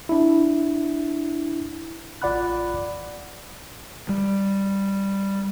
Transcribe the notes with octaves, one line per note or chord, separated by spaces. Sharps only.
D4 E4
A1 F4 D5 F#5 B5 F#6
G3